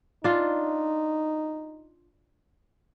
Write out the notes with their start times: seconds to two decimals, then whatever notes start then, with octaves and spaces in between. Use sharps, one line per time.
0.24 D4 D#4 F4